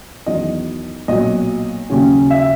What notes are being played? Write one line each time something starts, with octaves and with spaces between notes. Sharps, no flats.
E2 D#3 F#3 D#5
B1 A#2 F#3 D#5
D#2 C#3 F#3 C#4
E5